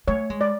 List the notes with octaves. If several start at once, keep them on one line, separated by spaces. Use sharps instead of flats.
A3 C#5
G#3
D5